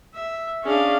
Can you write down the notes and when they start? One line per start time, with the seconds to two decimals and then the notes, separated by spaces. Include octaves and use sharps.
0.14 E5
0.64 C#4 D4 G#4 F5